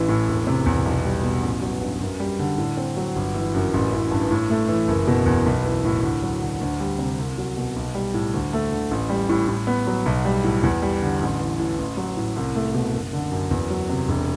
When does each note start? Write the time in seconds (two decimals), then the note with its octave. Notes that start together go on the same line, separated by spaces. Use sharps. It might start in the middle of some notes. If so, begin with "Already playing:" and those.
Already playing: A1 E3
0.09 A2
0.28 E1
0.47 C3
0.66 E2
0.85 B1
1.04 G3
1.23 B2
1.43 A1
1.62 F#3
1.81 G2
2.00 F#2
2.20 G3
2.39 D3
2.58 A2
2.77 C4
2.97 F#3
3.15 G1
3.34 E3
3.54 F#2
3.74 A1
3.92 E3
4.11 G2
4.31 A2
4.50 A3
4.68 E3
4.88 F#1
5.07 B2
5.26 E2
5.46 B1
5.64 E3
5.85 A2
6.03 D2
6.23 F#3
6.42 D3
6.61 D2
6.80 G3
6.99 C3
7.19 C2
7.38 F#3
7.57 B2
7.76 B1
7.95 G3
8.14 A2
8.34 D2
8.53 A3
8.72 D3
8.91 A1
9.09 G3
9.29 A2
9.48 A2
9.67 B3
9.87 F#3
10.06 B1
10.25 G3
10.44 A2
10.63 E2
10.82 G3
11.02 D3
11.21 A1
11.40 E3
11.59 A2
11.78 A1
11.97 F#3
12.17 A2
12.36 C2
12.55 A3
12.74 B2
12.93 F#1
13.13 D3
13.32 F#2
13.51 E2
13.70 F#3
13.89 C3
14.08 E1